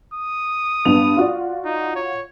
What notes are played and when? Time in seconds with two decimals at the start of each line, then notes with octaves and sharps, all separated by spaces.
0.14 D#6
0.85 G2 B3 F7
1.17 F4 F#4 D5
1.65 D#4
1.95 C#5